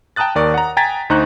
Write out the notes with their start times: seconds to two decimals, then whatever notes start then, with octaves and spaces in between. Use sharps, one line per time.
0.16 G5 A5 A#5 D#6 F#6 A6
0.35 D#2 A#4 D5 C#6
0.54 F#5 A#5
0.77 G5 G#5 A#5 G#6 A6 B6
1.10 D2 D#4 C5 A#5 C#6 F#6